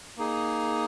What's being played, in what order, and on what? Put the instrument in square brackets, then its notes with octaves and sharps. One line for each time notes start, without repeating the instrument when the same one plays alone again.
[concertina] A#3 D#4 G#4